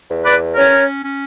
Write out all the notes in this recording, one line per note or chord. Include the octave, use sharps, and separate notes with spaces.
E2
B4 D5
C#4 A#4 C#5
C#4